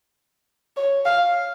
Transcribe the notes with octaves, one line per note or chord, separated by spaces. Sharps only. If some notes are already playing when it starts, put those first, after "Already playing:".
C#5
F5